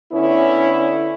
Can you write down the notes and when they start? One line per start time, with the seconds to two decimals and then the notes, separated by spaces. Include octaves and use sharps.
0.12 D3 B3 C#4 E4